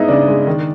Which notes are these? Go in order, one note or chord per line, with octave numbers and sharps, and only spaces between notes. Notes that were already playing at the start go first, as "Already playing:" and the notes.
Already playing: G#3 B3 D#4 E4 D#5
C#3 D4 D5
G#3
D#3